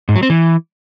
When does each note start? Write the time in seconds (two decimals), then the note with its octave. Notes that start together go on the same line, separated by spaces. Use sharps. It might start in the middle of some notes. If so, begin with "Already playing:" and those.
0.09 G#2
0.16 F#3
0.23 C4
0.30 E3